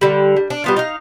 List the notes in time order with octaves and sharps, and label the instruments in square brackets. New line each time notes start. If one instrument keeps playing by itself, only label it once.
[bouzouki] D3 G3
G3
D4
G3 B3 F4
D#4 F5